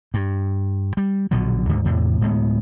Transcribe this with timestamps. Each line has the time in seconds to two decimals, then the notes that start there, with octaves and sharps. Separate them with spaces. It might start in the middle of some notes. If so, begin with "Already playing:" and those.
0.14 G2
0.97 G3
1.31 A#1 B2 D3 F#3
1.69 D2 G#2 D3
1.85 E2 A2 C3
2.21 D1 A2 G#3 B3